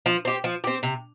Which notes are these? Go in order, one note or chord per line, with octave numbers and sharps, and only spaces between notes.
F3
C4 G4
F3
C4 G4
C3